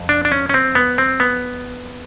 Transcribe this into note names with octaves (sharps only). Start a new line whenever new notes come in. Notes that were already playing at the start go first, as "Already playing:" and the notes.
Already playing: F2
D4
D4
C#4
C#4
C4
B3
C4
B3